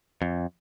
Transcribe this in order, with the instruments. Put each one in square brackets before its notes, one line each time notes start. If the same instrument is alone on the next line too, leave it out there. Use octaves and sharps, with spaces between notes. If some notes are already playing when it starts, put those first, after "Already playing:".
[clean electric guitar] F2